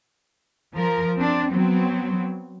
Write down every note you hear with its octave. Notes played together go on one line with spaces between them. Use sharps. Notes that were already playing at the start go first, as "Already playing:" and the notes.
F3 A#4
C4 D4
F#3 B3 C4